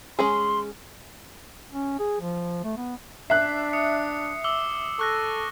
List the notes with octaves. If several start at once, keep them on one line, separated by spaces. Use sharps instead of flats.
G#3 C#4 G#4 C6
C#4
G#4
F3
A3
B3
D4 E5 F#6 C7
D#6 C#7
D6 E6 G7
A4 C#6 F#6 A#6